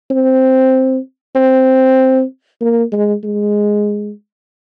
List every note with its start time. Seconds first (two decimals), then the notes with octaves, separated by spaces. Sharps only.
0.11 C4
1.36 C4
2.61 A#3
2.92 G#3
3.24 G#3